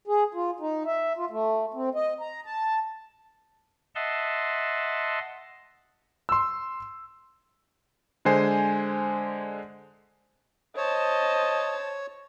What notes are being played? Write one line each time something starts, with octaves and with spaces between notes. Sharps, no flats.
G#4
F4
D#4
E5
F4
A3
C4
D#5
A#5
A5
D#5 E5 F#5 A5 C6
C6 E6
D3 G#3 C5 G#5 C7
C5 C#5 D#5 A5